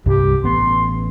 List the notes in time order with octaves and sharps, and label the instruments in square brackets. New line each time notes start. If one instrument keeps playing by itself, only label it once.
[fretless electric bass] C2 G2 [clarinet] G4
[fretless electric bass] A1 B3 [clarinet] C6